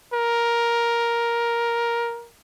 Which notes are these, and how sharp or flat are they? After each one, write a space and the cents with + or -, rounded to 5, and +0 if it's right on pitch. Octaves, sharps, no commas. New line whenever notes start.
A#4 +10